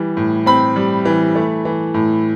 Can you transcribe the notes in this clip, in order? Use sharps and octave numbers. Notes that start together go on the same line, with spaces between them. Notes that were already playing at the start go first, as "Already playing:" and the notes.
Already playing: E3 G3
A2
C4 B5
G3
E3
A3
E3
A2